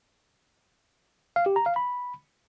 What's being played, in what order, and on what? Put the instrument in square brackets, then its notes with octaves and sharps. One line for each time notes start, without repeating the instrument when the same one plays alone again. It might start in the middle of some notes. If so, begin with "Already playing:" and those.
[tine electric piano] F5
G4
A#5
F5
B5